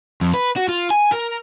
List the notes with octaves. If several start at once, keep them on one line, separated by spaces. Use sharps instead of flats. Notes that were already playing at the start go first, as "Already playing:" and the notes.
F2
B4
F#4
F4
G#5
A#4